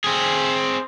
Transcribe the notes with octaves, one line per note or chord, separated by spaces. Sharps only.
C4 G#4